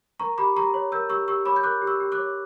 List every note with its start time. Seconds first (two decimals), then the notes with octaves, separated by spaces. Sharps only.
0.19 A#4 A#5 C#6
0.38 G4 B5 D6
0.56 G4 A#5 C#6
0.74 C#5
0.92 A#4 E6 G6
1.10 G4 C#6 E6
1.28 G4 C#6 E6
1.46 C#5 B5 D6
1.56 G6
1.63 A#4 D6 F#6
1.82 G4
1.87 C#6 E6
2.00 G4
2.12 D6 F#6
2.18 C#5